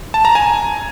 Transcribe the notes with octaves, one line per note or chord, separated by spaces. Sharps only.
A5
A#5
G#5